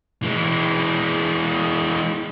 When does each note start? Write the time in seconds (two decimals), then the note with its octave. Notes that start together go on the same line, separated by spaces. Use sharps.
0.23 E3 G#3